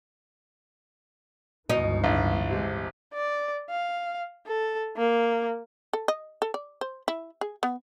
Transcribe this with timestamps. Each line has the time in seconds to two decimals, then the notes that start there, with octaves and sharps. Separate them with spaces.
1.70 G1 C#2 B2 E3 D#4
2.04 A1 G#3 D4 F4
2.50 C3 G#3
3.14 D5
3.70 F5
4.47 A4
4.97 A#3
5.93 A4
6.08 D#5
6.42 A4
6.54 D5
6.81 C5
7.08 E4
7.41 G#4
7.63 B3